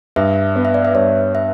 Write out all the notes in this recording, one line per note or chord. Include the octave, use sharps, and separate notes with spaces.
G2 E5
B3
E5
D5
E5
G2 C#5
E5